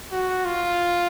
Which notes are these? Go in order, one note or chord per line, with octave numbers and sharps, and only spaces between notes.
F#4
F4